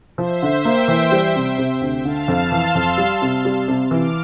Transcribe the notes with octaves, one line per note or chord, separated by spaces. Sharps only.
F3 C5 E5
D3
A#3 E5 G5
E3
G3
C3
C3
D2
D3 F5 A5
F2
E3 C6 E6
F2
G3
C3
G3
C3
E3 D6 F6